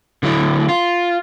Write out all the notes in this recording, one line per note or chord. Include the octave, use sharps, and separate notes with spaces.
D3 F#3 E4
F4